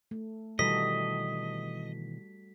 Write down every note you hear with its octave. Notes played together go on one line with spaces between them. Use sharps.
A3
B2 D#3 E3 G3 F#4 A4 D#5 B6